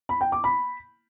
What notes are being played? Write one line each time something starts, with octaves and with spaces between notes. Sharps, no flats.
B5
G5
D6
B5